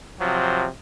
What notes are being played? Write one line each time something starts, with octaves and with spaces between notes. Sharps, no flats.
C3 F3 F#3